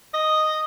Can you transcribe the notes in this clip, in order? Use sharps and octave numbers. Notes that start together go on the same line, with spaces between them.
D#5